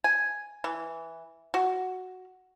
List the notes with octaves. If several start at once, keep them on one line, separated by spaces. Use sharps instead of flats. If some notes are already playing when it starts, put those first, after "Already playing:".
G#5
E3
F#4